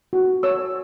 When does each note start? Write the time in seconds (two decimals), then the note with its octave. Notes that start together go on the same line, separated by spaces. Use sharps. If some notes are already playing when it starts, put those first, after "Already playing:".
0.13 F#4
0.43 C#5 E6